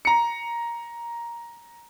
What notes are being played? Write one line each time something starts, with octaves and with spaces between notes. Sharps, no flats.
A#5 C#7